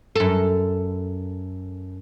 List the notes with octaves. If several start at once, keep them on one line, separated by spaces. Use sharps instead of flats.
F#2 A4